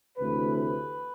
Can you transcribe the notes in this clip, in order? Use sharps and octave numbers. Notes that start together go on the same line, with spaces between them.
D2 C3 E3 A3 B4
B4